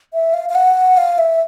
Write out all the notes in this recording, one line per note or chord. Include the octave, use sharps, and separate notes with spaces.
E5
F5
F5
F#5
F5
E5